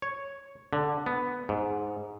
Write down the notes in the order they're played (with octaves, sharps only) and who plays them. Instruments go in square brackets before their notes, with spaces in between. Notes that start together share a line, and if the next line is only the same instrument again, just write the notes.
[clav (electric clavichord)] C#5
D3
B3
G#2